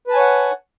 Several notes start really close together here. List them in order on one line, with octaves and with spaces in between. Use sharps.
B4 A5 G#5 C#5 F#5